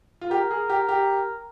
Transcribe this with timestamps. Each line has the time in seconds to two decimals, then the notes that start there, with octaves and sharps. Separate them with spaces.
0.21 F4
0.31 G4 A#4
0.51 G#4
0.70 G4
0.89 G4